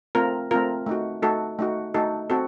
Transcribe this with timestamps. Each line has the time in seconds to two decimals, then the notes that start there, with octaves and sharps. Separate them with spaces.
0.15 A3 C4 F4 A#4
0.51 A3 C4 F4 A#4
0.86 A3 D#4 F#4
1.22 A3 D#4 F#4 A4
1.59 A3 D#4 F#4
1.94 A3 D#4 F#4 A4
2.30 C4 F#4 A4